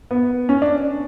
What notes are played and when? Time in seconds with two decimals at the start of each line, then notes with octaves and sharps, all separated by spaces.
0.11 B3
0.49 C#4
0.62 D4